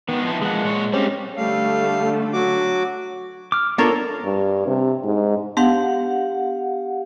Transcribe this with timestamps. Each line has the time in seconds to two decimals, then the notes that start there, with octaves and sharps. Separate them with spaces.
0.09 D#3 G#3 B3
0.25 F3 D#4 E4
0.42 E3 F3 G#3 A#3 F#5
0.64 A#2 C#5
0.93 G3 A#3 C4 C#4 G4
1.37 D3 G3 A3 F5
2.33 F#3 F#4 D6
3.52 D6 F6
3.78 B3 D4 F4 A4 A#4 C#5
4.25 G2
4.67 C3
5.04 G#2
5.57 B3 D4 G4 F5 F#5